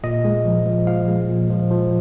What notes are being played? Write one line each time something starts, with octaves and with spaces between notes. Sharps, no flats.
A#2 D#5
G#3
F3
F3
F3 F5
G#3
A#2
F3
F3